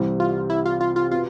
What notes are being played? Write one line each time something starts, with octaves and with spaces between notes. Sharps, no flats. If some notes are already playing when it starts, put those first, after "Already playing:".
Already playing: C2 C3 E3 G3 C4
F4
E4
F4
F4
F4
B2 B3 F4